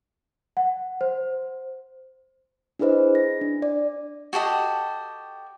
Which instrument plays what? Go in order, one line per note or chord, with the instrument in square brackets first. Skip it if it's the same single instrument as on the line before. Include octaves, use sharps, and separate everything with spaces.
[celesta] F#5
C5
[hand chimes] D4 E4 G#4 B4 C5 D#5
A#6
D4
D5
[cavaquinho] F#4 G4 A4 D#5